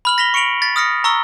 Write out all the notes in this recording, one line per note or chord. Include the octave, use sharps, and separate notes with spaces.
B5 F6 F#7
A#6 B6 F7 G7
C#6 C#7 D7 F7 F#7
A6 B6
D#6 F6 A#6 C#7
A#5 C#6 E6 G7